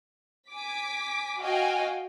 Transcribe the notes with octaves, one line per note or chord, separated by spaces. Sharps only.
G#5 D6 B6
F#4 D#5 F5 G5 G#5